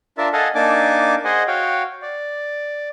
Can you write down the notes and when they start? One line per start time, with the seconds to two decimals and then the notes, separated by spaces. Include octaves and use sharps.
0.18 D4 F4 A#4 E5 A5
0.33 A4 D#5 F5 F#5 G#5 A5
0.55 A#3 D4 D#4 G#5 A5 D6
1.25 G#4 C5 D#5 F#5 G#5
1.48 F#4 C#5 F5 G5
2.02 D5